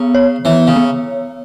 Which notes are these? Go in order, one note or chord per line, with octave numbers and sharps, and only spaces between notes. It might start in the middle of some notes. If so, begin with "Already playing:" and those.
Already playing: C#3 B3
C#5
E3 B3
C#3
B3